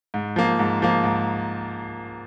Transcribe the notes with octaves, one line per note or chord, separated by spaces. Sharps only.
G#2
F3 A#3
G#2
F3 A#3
G#2